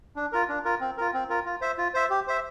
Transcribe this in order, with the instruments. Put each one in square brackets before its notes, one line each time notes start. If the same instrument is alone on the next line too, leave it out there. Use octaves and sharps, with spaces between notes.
[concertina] D4
F4 A#4
D4
F4 A#4
C4
F4 A#4
C4
F4 A#4
F4
C5 E5
F4
C5 E5
G4
C5 E5